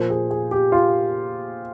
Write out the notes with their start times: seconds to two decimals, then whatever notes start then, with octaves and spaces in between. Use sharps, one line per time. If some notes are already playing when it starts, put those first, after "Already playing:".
Already playing: A#2 F3 A#3 C5
0.10 G#4
0.31 G#4
0.51 G4
0.72 F4